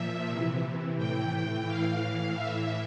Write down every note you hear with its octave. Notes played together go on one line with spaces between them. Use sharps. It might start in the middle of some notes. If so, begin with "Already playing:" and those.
Already playing: A#2 F3 E5
C3 E3
A2 E3 G5
A2 E3 F5
A2 E3 E5